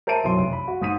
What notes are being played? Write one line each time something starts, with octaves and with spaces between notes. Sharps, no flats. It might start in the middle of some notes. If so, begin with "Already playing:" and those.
A#4 C5 E5 A5 D7 D#7
B1 F#2 E3 C4 C6
F1
B5
F#4
G1 G#2 D#6 B6 D#7